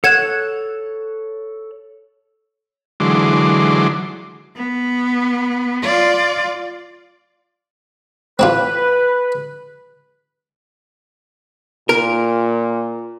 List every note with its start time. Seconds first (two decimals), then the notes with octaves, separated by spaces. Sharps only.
0.04 A4 C#5 F#5 F#6 G#6 E7
3.00 D3 E3 F#3 G#3 C6 D6
4.56 B3
5.83 F4 D5
8.39 C4 D4 F4 B4
11.89 A#2 A#4